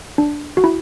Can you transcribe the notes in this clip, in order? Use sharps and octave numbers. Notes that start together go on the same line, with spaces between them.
D4
F#4
E4